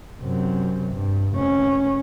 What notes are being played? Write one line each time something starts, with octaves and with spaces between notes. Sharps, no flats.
F#2 C3
G2
F1 C#4